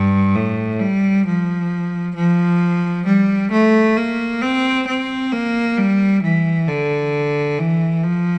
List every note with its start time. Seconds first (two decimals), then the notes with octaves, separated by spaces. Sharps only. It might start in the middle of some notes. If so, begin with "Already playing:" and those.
Already playing: G2
0.35 A2
0.80 G3
1.26 F3
2.15 F3
3.06 G3
3.52 A3
3.97 A#3
4.42 C4
4.87 C4
5.32 A#3
5.77 G3
6.23 E3
6.68 D3
7.59 E3
8.03 F3